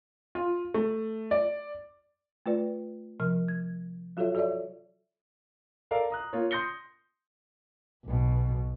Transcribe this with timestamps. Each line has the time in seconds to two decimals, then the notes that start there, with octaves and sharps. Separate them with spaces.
0.35 F4
0.74 A3
1.31 D5
2.46 A3 F4 B4 D5
3.20 C3 F3 A#4 F6
3.48 G#6
4.17 F#3 F4 F#4 A4 C#5 E5
4.35 F#4 A4 C#5 D5 E5
5.91 A4 A#4 D5 F5 A#5
6.10 A#5 D#6 F#6
6.33 A#3 F4 A#4 C#5
6.51 C6 D#6 G6 A#6 C#7 G7
8.05 B1 B2